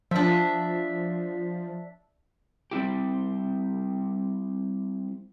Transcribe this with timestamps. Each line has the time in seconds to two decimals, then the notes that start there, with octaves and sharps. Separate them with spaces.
0.11 F3 D4 E5
2.71 G3 C4 E4 G4